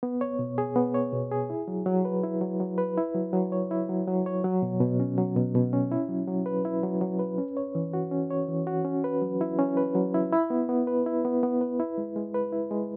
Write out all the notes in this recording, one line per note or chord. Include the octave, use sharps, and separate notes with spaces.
B3
C#5
B2
G#4
B3
C#5
B2
G#4
E4
F#3
F#3
B4
E4
F#3
F#3
B4
E4
F#3
F#3
C#5
E4
F#3
F#3
C#5
F#3
B2
B2
C#4
F#3
B2
B2
C#4
E4
F#3
F#3
B4
E4
F#3
F#3
B4
C#4
C#5
E3
F#4
C#4
C#5
E3
F#4
C#4
B4
F#3
E4
C#4
B4
F#3
E4
E4
B3
B3
B4
E4
B3
B3
B4
E4
G#3
G#3
B4
E4
G#3